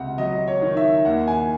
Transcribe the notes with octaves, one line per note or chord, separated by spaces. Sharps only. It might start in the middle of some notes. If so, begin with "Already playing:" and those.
Already playing: C#2 C3 F#5
F#3 D#5
C#5
D#3
E5
D#2 F#5
G#5